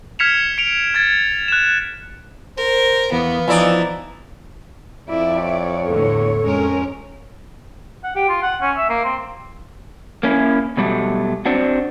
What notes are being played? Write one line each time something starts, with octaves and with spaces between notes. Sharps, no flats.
F6 G#6 B6 C#7 E7 F7
C#7 D7 F7
G#6 A6
F#6 E7
A#4 C5
E2 B3 F5
E3 F3 D#4 E4 D5
F2 E4 D5 E5
C#5
E2 A2 D3 A4
F2 G#3 C#4 A#4
F#5
G4
F4
F#5
C#4
E5
A#3
C4
A#3 C#4 E4
B2 F#3 G3 A3
C4 D4 F#4